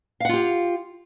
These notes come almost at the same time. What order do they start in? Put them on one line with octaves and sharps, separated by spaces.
F5 F#5 F4 G4